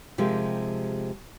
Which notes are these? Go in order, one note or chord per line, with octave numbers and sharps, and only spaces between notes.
C3 F3 G#3 G4 A#4